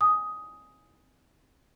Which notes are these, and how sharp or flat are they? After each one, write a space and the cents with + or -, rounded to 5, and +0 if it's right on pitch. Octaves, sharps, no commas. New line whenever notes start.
G#5 +0 D#6 +10